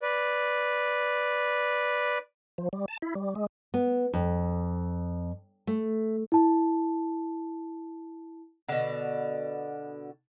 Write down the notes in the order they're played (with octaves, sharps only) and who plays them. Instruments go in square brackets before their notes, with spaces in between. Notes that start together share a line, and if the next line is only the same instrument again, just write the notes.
[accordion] B4 D5
[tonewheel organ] F3
G3
A5
E4
G3
G#3
[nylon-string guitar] B3
F2
A3
[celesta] E4 A5
[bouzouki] B2 D3